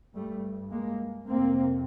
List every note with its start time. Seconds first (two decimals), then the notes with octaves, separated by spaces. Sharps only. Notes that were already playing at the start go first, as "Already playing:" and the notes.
0.14 G2 G3 A3
0.71 G#3 A#3
1.27 F2 C3 A#3 C4